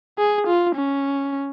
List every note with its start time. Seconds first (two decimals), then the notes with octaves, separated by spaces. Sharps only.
0.18 G#4
0.47 F4
0.76 C#4